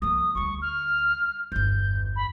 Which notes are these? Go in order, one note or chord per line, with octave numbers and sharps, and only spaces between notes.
F3 A#3 D#6
D2 G3 C#6
F6
G1 E2 G6
B5